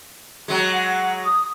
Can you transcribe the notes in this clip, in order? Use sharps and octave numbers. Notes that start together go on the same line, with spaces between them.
F#3 G#3
F#5
D#6